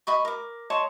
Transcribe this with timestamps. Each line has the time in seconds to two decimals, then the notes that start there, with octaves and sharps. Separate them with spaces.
0.07 D#5 B5 C#6
0.25 A#4 D6
0.70 C#5 D#5 A5 C6